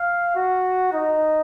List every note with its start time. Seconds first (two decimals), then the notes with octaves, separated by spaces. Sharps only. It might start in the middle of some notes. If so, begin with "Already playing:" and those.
Already playing: F5
0.35 F#4
0.93 D#4